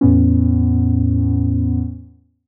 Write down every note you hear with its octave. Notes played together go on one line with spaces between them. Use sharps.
E2 A2 B3 C#4